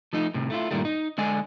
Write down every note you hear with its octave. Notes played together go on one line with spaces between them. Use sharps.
F3 A3 D#4
A2 C3
A3 E4 F4
G2 A#2 D#3 G3 A3
D#4
D3 G#3 D5 D#5 G#5